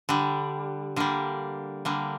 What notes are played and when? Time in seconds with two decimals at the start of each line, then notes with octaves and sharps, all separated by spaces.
0.09 D3 G3
0.96 D3 G3 A#3
1.85 D3 G3 A#3